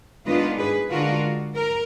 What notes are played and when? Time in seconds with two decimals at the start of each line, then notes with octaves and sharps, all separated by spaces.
0.26 D#3 G#3 B3 D4 F4 B4 D#5
0.58 G#4 B4
0.90 D3 G#3 D4 F4 F#4 A#4
1.55 A#4